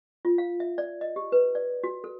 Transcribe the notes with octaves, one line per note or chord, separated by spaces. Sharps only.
F4
F5
E5
D5
D#5
G4
B4
D5
F#4
A4